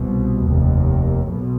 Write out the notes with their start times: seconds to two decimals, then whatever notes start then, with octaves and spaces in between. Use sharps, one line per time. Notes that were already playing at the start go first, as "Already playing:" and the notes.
Already playing: C2 B2
0.43 F1 D#2
1.25 B1 B2